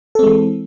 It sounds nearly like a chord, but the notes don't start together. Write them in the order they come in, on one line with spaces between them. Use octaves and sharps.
A4 C4 G#3 E3